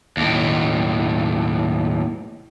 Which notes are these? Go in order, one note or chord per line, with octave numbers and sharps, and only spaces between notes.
D#2 A2